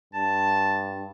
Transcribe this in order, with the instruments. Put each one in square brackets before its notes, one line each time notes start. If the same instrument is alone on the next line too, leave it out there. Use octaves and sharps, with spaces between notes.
[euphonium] G2 [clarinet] A5